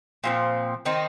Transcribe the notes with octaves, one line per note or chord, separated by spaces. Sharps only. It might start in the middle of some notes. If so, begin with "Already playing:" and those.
A#2 F3 C4
D#3 C4 D#4